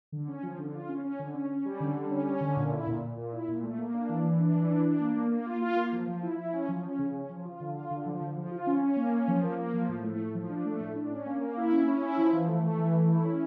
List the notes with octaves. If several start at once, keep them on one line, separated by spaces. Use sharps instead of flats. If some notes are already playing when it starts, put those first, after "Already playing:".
D3
C#4
F3
D3
F4
C#4
C#4
D3
C#4
C#4
G3
D3
G3
C#4
C#4
D3
A#2
E4
A#2
A#2
A#2
E4
A#2
A3
A#3
D4
E3
E3
D4
E3
D4
D4
A#3
A#3
A#3
F4
F4
A#3
F3
F3
E4
E4
C#4
F3
C#4
C#3
C#4
F3
F4
D3
F4
D3
F3
D3
F3
F4
C#4
C#4
A#3
C#4
F3
A#3
A#3
F3
A2
A3
A2
F3
D4
A3
A2
D4
C#4
A#3
A#3
E4
C#4
C#4
E4
F3
E3
A3
A3
E3
A3
E4
C#4